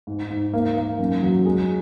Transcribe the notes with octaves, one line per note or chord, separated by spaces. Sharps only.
G#2
G#2
A#3
A#3
F#2
F#3
G#3